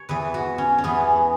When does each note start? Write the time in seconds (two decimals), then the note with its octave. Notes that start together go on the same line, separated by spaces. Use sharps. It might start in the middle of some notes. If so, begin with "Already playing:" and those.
Already playing: C#5
0.09 E2 E3 B4
0.34 F#4
0.58 C#4
0.78 C#4
0.84 E2 E3 B3